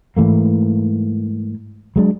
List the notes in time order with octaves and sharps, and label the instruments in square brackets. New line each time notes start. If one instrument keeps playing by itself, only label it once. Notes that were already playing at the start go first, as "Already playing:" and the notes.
[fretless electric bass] G#2 E3 A3 A#3
F#3 G#3 D4